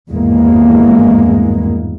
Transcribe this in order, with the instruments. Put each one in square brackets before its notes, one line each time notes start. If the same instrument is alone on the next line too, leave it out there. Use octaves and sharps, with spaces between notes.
[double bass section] G#1 E2 G2 E3 G#3 A#3